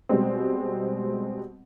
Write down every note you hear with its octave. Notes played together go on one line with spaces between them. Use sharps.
B2 G3 G#3 C4